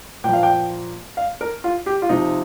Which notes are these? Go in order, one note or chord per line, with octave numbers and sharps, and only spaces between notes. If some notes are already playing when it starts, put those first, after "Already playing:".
A#2 F3 F5 G5
G5
F5
A#4
F4
G4
F4
C3 F3 D#4